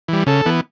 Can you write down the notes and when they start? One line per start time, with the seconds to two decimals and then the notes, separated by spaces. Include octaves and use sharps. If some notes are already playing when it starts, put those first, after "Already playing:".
0.08 E3 G3
0.26 C#3 A4
0.46 E3 B3